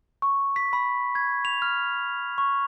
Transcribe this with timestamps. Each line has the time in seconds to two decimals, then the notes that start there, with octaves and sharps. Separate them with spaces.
0.22 C#6
0.56 B6
0.73 B5
1.15 G#6
1.45 F7
1.62 F6
2.38 C#6